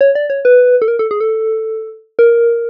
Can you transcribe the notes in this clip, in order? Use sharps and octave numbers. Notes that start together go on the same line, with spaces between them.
C#5
D5
C#5
B4
A4
A#4
A4
G#4
A4
A#4